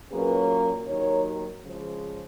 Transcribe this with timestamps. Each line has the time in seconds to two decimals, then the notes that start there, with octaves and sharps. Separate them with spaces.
0.11 A#2 F#3 A#3 C#4 G#4 B4
0.86 D#2 D#3 F#3 A#4 C#5
1.62 C#3 F3 G#3